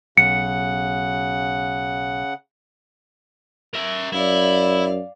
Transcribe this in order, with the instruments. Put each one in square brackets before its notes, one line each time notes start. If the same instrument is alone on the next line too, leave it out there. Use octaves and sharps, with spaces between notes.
[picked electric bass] B1 [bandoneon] C#3 F#5 [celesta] C#7
[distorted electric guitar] A#4 E5
[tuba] F#2 [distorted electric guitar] E4 [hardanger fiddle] D5 F5